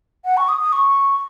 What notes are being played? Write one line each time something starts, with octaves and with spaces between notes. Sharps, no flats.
F#5
C#6
D#6
D#6
C#6